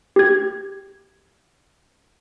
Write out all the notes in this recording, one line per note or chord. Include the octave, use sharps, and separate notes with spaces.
G4 G#6